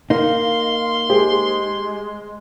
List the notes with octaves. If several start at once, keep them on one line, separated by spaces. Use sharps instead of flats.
A#3 D#4 F5 C6
G#3 G4 G#4 C5